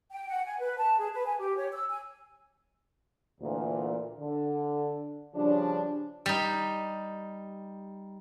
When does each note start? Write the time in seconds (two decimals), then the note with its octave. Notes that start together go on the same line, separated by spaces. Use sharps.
0.11 G5
0.28 F#5
0.46 G#5
0.59 B4
0.78 A5
0.98 G#4
1.13 B4
1.26 G#5
1.39 G4
1.56 C#5
1.72 E6
1.89 G#5
3.41 D2 A#2 E3
4.20 D3
5.35 C#3 F3 G3 D4
6.26 G3 D#4